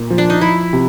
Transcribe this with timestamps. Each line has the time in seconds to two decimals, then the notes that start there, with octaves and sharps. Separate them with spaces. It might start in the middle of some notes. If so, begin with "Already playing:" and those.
Already playing: A#2
0.10 F3
0.18 D4
0.30 D#4
0.41 F3 E4
0.73 C3